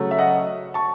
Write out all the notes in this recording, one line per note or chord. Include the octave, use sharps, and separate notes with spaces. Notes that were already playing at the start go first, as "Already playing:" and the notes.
Already playing: C#3 F#3 A3 C#4
E5
D#5 F#5
A5 C#6